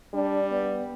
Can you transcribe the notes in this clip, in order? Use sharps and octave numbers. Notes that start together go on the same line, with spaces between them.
G3 D4
B3